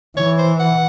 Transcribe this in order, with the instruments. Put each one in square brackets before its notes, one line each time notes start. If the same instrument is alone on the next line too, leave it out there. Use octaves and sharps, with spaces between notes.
[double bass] E3 [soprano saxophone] C#5
[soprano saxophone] C5
F#5